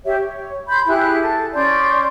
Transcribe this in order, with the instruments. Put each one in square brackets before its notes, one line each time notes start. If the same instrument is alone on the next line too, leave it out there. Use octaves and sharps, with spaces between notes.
[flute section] G4 C#5 E5
C#5
B5 C6 G6
E4 G4 G#4 F#6
A4
C#4 D5 C6 G6